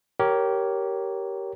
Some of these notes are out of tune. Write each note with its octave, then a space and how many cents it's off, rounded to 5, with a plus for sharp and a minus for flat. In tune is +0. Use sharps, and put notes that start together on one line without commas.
G4 -15 A#4 +0 C#5 +0